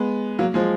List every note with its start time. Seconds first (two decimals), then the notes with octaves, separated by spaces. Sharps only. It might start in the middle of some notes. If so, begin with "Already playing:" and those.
Already playing: G#3 B3
0.39 F#3 A#3
0.54 F3 G#3